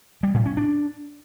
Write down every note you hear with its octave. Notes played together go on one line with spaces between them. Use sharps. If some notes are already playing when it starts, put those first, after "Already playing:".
G3
A2
C#4
D4